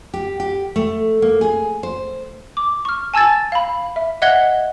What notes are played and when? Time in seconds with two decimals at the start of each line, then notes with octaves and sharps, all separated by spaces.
0.14 G4
0.40 G4
0.76 A3
1.22 A#3
1.41 G#4
1.83 C5
2.57 D6
2.85 C#6 F6
3.14 G#5 A5 E6 G#6 A6
3.52 F5 B5
3.96 E5
4.22 D#5 E5 F#5 F#6 G#6 G7